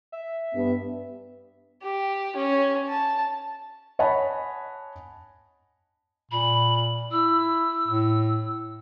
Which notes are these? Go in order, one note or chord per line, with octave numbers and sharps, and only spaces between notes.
E5
G2 B3
G4
C#4
A5
C#5 D#5 F#5 G#5 A5 B5
A#2 B5
E4 E6
A2